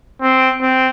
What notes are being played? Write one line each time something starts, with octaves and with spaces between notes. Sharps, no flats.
C4
C4